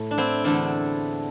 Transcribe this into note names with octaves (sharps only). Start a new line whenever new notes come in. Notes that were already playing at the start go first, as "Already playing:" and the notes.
Already playing: A2 A3
D4
C4 E4
E2 D3 A3 D4